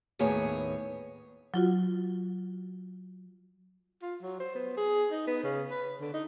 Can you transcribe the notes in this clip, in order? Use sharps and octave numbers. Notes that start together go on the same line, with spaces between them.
D#2 A2 B3 G#4 C#5
F#3 F4 F#4
F4
F#3
C5
B3
G#4
D#4
B3
C#3
B4
D3
D#4